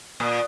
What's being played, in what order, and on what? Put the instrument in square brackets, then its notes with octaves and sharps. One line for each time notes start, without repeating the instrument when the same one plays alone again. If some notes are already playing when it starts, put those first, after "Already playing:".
[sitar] A#2 [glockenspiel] D#6